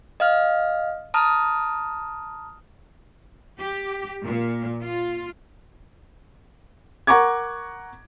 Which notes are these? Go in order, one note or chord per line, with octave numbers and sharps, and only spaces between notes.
D#5 F5 F6
A5 A#5 D#6 F6
G4
A#2
F4
A#4 F#5 A#5 C#6 D6 G#6